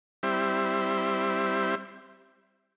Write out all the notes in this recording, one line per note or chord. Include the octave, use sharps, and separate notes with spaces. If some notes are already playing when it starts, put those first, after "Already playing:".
G3 C4 E4